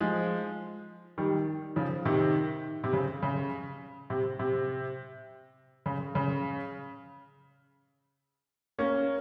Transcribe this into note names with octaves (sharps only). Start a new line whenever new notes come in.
F3 G#3
D#3 G3
C#3 F3
C3 D#3
C3
C#3
C#3
C3
C3
C#3
C#3
A#3 C#4